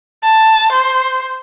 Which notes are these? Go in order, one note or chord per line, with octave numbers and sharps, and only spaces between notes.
A5
C5